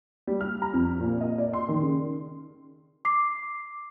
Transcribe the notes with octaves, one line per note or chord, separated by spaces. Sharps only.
G3
F6
A#5
F2
A#2
D#5
D5
C6
D#3
C#3
D6 C7